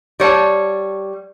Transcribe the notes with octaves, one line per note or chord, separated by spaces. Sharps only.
G3 C#5 A5